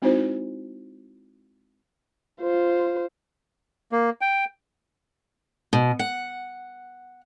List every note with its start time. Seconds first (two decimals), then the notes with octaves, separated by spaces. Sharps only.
0.02 G#3 C4 D#4 E4 F#4 C5
2.41 F4 C5
3.92 A#3
4.21 G5
5.73 B2
5.99 F#5